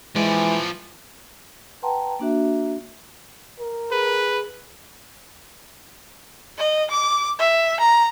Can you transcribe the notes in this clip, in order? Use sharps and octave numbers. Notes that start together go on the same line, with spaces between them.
E3 F3 G#3 D5
B4 F#5 G5 A5 A#5 C6
A#3 D4 F#4 E5
A#4
G#4 B4
D#5
D6
E5
A#5